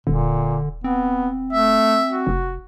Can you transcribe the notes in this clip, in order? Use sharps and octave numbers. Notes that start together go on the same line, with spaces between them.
D#1 A#2 D3
B3 C4
A3 E5
F#4
F1